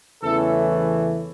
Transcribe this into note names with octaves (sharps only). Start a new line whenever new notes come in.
E2 C#3 E3 A3 C#4 A4